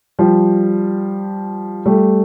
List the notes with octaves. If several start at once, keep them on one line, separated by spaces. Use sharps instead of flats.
F3 G3
G3 A3